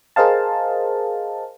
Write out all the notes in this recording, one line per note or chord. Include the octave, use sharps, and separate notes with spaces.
G#4 A#4 C5 D#5 F5 A5